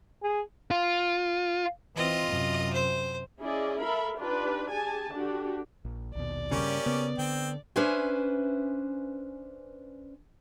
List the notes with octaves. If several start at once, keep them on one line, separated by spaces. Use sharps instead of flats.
G#4
F4
E3 C4 F4 D#5
F#2 C3
C5
C#4 E4 G#4 D5 D#5
A4 A#4 E5 F5 B5
D4 D#4 F4 G4 B4
G4 G#4 G#5 A5
D3 D4 F#4 G4
A#1
A#1 D#2 B2 D5
G2 C#3 A#3 C#4 G4
C#3 B3
D3 C4 G5
C#4 D4 B4 C5 E5 G#5